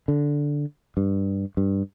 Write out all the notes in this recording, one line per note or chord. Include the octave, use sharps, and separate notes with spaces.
D3
G2
G2